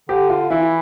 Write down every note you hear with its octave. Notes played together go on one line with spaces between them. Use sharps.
D3 G4
F4
E3 E4